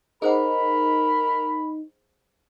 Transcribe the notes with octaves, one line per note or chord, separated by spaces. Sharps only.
D#4 G#4 A#4 C5 F#5 B5